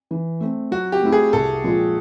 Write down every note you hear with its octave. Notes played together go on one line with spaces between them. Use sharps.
E3
A3 C4
F#3 F#4
G4
A3 C4 E4
G#4
C2 A4
A#2 F3 G#3